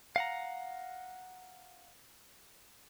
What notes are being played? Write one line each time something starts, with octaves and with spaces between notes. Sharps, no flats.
F5 F#5 A#5